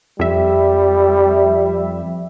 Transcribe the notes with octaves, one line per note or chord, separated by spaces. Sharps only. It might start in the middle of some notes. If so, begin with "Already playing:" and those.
F2 G3 E5